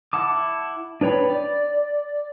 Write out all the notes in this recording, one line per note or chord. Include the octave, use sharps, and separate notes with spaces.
E4 F#5 A5 D6
D4 B4 C#5 G5 B5
D5